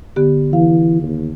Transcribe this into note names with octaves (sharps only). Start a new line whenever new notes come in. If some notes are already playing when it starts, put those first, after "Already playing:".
D3 B3 G4
E3 F5
D#2